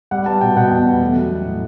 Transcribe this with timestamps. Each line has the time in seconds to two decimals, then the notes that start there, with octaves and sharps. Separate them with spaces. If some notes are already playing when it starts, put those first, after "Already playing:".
0.11 G3 F#5
0.26 B3 A5
0.41 B2 G5
0.56 B2 F#5
0.71 E2
0.86 E2
1.01 A3
1.16 F#3
1.31 A3
1.46 A2